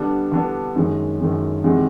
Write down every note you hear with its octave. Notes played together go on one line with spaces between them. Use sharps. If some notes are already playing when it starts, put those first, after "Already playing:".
Already playing: D3 G3 B3 D4
D3 G3 B3 D4
F#2 D#3 G#3
F#2 D#3 G#3
E2 C3 D#3 G#3